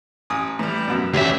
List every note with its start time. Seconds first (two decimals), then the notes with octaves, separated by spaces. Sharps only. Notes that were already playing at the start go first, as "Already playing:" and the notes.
0.30 A1 G#5 D#6
0.59 A2 E3 G3
0.88 F#2 B2
1.14 D2 A2 E3 C#4 G4 E5